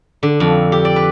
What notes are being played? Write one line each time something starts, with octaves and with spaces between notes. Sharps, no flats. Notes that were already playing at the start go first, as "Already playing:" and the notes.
D3
F2
G4
D5
B4